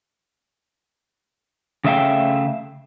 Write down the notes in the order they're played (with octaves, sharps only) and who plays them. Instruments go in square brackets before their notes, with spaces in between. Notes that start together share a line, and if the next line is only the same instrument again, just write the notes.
[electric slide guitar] C#3 A3 E5 F5 G5